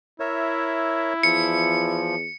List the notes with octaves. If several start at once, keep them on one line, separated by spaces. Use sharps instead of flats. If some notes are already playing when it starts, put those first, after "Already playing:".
E4 A#4 C#5 E5
E2 F3 C#7